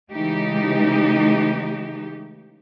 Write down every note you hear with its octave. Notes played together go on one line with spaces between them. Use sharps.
C#3 E3 G#3 A3 D#4 G4